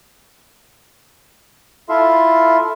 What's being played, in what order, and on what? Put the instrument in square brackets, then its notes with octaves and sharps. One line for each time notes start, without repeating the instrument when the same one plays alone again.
[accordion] E4 F4 A4 E5 F5 C6